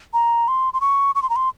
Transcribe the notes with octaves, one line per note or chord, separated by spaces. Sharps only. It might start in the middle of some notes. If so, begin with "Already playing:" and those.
A#5
C6
C6
C#6
C#6
C6
A#5
C6